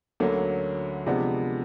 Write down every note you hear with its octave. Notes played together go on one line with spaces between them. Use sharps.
D2 D3 F#3 A#3 C#4
C3 F3 G#3 B3 D4